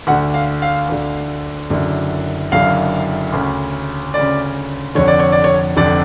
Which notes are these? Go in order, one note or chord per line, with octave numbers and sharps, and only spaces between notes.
D2 D3 F#5
F5
F5
D2 D3
F#1 F#2 D3
F#1 F#2 D3 F5
D2 C#3
D2 C#3 D5
F1 F2 D3 C#5
D5
C#5
D5
C#5
F1 F2 D3 D5